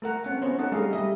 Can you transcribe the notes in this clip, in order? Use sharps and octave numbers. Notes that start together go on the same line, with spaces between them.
A3 A#4 F#5 A#5
C4 C#4 F#5
B3 C#4 C5 C#5
D#4 A4 F#5
G3 A3 D4 G#4 D#5 F5
G3 D#5 E5